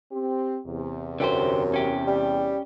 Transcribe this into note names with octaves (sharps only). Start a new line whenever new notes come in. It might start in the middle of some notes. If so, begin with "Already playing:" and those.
C4 G4
E2 C3
F#2 D3 G4 C5
C#4 G4
G3